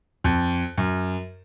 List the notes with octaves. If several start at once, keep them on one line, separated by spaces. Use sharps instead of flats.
F2
F#2